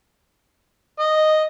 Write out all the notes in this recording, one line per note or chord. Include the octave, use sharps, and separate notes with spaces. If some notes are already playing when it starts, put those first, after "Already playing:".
D#5